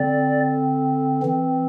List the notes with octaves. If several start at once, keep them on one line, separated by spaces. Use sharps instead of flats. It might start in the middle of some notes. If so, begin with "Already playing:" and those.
Already playing: D3 C4 D5
E3 C4